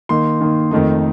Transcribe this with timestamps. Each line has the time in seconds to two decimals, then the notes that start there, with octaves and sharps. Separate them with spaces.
0.09 D#3 A#3 D#4 C6
0.41 D#3 A#3 D#4
0.71 F2 D#3 A3 D#4